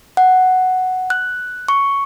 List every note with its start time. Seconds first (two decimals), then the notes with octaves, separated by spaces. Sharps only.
0.17 F#5
1.10 F#6
1.68 C#6